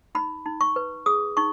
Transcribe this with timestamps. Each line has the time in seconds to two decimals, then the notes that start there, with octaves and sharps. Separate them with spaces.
0.15 D#4 B5
0.46 D#4
0.61 C#6
0.76 B4
1.06 G#4 D#6
1.37 D#4 C#6